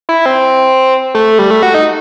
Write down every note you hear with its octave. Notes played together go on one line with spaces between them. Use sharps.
E4
C4
A3
G3
A3
F#4
D#4